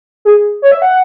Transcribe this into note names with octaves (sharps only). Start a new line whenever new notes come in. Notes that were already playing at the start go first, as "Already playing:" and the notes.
G#4
C#5
E5
F#5